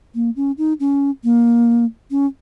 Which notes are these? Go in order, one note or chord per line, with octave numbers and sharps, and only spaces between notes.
A#3
C#4
D#4
C#4
A#3
C#4